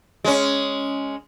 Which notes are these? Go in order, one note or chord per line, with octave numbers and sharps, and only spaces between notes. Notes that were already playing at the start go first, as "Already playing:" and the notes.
G#3 C#4